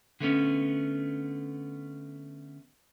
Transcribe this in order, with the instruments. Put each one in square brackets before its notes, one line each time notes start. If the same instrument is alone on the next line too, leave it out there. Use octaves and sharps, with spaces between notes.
[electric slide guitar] D3 A3 B3 C#4